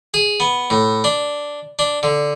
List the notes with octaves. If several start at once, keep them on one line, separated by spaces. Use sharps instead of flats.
G#4
B3
A2
D4
D4
D3